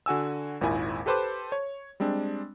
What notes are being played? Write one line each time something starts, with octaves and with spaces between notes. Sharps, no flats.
D3 F#4 G#5 E6
G#1 D#2 A#2 E4 G#5
G4 A4 B4 C5 A5 D6
C#5
G3 G#3 C4 D4